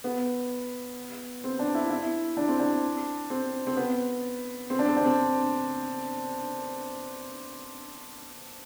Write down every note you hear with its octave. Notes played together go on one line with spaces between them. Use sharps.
B3
C4
D4
E4
E4
D4
C4
D4
C4
C4
B3
C4
D4
C4
D4
C4